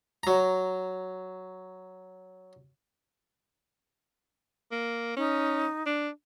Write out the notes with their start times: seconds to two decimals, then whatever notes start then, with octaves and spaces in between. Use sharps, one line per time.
0.23 F#3 A#5
4.72 A#3
5.17 C#4 D#4
5.86 D4